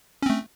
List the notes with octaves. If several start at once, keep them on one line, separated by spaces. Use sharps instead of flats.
A3 C4 C#4